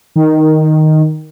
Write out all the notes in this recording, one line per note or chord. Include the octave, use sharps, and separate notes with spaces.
D#3